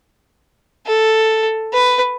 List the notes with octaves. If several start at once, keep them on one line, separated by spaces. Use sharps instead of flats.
A4
B4